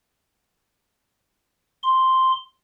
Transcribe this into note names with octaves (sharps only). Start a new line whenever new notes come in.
C6